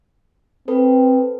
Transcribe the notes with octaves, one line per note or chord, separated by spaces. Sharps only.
C4 A4 B4